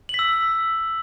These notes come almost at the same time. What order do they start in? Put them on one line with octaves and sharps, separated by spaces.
F#7 B6 E6